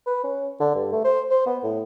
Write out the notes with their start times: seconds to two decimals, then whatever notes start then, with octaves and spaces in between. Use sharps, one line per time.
0.07 B4
0.24 C#4
0.60 D3
0.75 G2
0.92 A3
1.05 C5
1.31 C5
1.47 B3
1.63 A2